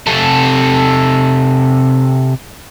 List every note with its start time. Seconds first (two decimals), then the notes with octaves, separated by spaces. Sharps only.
0.07 C3 A4